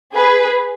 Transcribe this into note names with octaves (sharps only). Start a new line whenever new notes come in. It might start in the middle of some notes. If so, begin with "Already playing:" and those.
G#4 B4